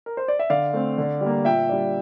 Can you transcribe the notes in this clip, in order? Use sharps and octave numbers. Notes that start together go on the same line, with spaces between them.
A#4
C5
D5
E5
D3 D5 F5
A3 C4
D3
G3
A#3
A#2 E5 G5
G3 D4